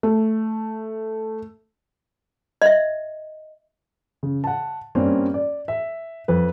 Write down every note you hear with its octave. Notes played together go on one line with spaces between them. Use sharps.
A3
D#5 E5
C#3
F#5 A5
G2 A#3 C4 C#4
D5
E5
F2 B4